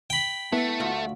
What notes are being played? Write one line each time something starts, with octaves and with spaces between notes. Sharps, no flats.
G5 B5
A3 B3 E4
D2 F4 F#4